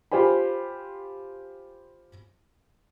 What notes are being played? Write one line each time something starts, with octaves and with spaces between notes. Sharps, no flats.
F4 G4 C5 G#5 B5